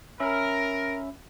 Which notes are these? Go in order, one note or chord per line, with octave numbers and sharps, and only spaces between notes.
C#4 A#4 E5 B5